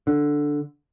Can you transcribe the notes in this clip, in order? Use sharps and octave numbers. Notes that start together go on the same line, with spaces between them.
D3